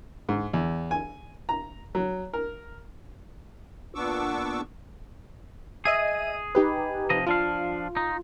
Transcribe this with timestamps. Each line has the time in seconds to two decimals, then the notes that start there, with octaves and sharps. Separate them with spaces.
0.29 G#2
0.53 E2
0.91 G#5
1.49 A#5
1.95 F#3
2.34 A#4
3.94 A#2 B3 D4 C#6 D6 E6
5.85 G#4 D#5 E5 D#7
6.55 D#4 G4 B4
7.10 C3 F3 D#5
7.26 F3 D4 F4 F5
7.97 D#4